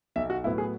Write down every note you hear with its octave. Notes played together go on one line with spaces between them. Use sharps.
B1 E5
F#4
A2 F#3 B3 E4
G#4